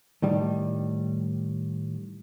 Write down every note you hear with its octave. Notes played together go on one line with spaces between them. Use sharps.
A2 D#3 G3